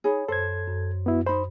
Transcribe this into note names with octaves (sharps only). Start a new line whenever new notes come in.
D#4 G#4 C#5 B5
F#2 A4 C5 G#6
F#2
B3 E4 F#4
D#4 C5 B5